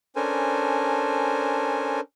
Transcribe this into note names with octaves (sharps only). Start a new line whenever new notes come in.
C#4 D4 A4 A#4 C5 G#5